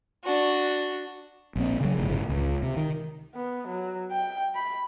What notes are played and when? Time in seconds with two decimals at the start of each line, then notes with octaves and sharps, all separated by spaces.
0.24 D4 F#4
1.56 A#1 A#2 C4
1.81 C#3 F#3
1.98 G1 A2 C#3 C#4
2.29 C#2
2.63 C3
2.77 D#3
3.35 B3
3.67 F#3
4.11 G5
4.55 B5